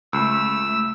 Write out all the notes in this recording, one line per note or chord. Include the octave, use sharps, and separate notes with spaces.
C#2 A3 E6